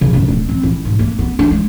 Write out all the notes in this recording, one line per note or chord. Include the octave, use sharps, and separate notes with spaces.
C#3
F#2
D1
C4
A1
G#2
A#3
B3
D4
G#3